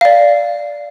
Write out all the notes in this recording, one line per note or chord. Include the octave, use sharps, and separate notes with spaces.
D5 F5